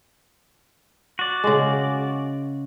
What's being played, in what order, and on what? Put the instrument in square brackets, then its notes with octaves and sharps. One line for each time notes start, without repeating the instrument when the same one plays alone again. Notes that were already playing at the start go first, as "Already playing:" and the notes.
[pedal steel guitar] F#4 D5
[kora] C#3 G#3